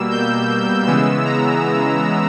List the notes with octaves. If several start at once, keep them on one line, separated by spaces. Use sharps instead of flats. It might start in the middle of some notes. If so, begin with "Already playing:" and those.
Already playing: B2 G3 A#3 E6
G6
C#3 E3 G#3 B3 E6
A#5